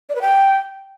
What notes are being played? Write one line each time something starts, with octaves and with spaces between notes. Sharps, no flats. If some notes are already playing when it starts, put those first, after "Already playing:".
D5
B4
G5